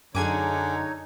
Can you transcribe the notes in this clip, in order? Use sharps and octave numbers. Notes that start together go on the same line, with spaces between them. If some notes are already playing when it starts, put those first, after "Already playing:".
F#2 D3 D#4 G#4 C#5 G#5 D6 G#6